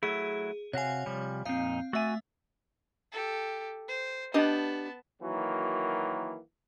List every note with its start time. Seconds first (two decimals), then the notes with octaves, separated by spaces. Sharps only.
0.03 F#3 A3 E4 G#4
0.73 C3 F#4 C#5 F5 G#5
1.06 C3 F3 G3
1.45 F2 A#2 C4 D#4 F5
1.93 A3 F#4 E5 G#5
3.12 G4 A4
3.88 C5
4.34 B3 D4 G4 D#5 A5
5.22 D#3 E3 F#3 A#3 F#4